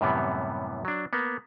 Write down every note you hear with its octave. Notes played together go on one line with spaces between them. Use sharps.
F#2 A2 C3 E3 G3 B3
F#3 D4
A#3 B3